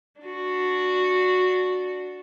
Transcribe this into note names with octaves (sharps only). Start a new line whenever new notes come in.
D4 F#4